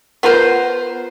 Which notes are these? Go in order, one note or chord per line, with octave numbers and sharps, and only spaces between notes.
B3 F4 A#4 C5